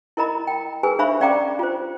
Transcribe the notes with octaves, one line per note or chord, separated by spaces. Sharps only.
E4 A#4 D#5 A#5 B5
G5
G#4 A#4 B4 G#5
D4 C5 E5 F5 B5 C#6
C#4 D5 F5 G5 A#5 D6
F4 C5